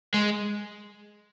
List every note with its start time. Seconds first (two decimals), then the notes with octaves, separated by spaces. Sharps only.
0.14 G#3